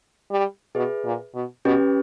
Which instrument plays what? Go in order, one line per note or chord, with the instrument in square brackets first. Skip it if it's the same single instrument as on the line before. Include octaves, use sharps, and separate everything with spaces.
[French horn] G3
[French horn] B2 [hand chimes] G#4 B4 E5
[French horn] A#2
B2
[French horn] B2 [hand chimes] C#4 G4 B4